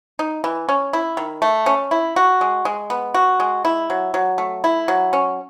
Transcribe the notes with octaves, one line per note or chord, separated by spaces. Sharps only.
D#4
E3
C#4
E4
D#3
A3
C#4
E4
F#4
G#3
G#3
B3
F#4
G#3
E4
F#3
F#3
A3
E4
F#3
C#4